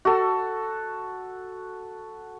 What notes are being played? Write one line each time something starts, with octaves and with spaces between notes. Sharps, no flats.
F#4 A4